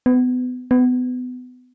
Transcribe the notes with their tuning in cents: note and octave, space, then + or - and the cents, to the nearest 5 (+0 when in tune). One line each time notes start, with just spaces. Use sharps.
B3 +25
B3 +25